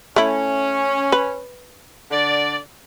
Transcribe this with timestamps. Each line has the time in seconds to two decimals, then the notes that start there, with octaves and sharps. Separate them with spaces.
0.16 A3 C#4 E4
1.12 B4
2.11 D3 D5